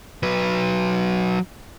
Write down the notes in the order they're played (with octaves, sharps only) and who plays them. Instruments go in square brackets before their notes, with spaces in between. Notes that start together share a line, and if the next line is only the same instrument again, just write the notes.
[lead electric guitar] F#3 B4